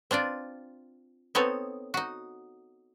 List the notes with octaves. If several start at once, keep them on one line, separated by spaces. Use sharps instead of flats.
C4 D4 F4 D5
B3 C4 D#4 A4 C#5
D#4 F#4